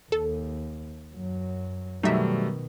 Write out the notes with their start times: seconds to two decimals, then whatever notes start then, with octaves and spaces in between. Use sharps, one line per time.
0.12 D#2 A4
1.13 F#2 F#3
2.03 B2 D#3 F#3 G3 A3 D#4 E5